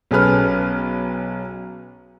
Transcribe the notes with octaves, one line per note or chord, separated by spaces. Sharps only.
B1 C#4 G#4 A4 B4 F6